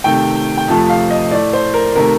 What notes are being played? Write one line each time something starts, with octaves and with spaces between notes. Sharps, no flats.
C3 D#3 A3 G5
G5
F2 C3 F3 A3 A5
F5
D#5
A2 A3 D5
C5
A#4
C3 D#3 A3 A#4